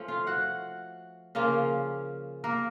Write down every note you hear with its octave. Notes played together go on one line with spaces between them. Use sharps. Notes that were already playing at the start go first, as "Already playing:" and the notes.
Already playing: F3 A3 C#4
F4 F5
F#4 F#5
C#3 F3 A#3 C#4 F4 F5
A#3 A#4